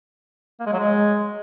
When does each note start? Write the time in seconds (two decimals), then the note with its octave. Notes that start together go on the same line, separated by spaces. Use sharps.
0.60 A#3
0.66 G#3
0.73 F#3
0.79 G#3